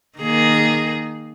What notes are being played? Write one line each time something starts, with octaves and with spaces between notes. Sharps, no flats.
D#3 A#3 G#4